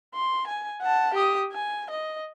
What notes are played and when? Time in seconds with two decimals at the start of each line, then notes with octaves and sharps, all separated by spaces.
0.14 C6
0.47 G#5
0.82 F#5 A5
1.14 G4 D#6
1.52 G#5
1.90 D#5